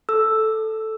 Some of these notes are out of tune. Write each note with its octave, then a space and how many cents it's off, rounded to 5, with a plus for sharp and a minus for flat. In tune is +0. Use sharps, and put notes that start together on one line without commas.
A4 +0 E6 +5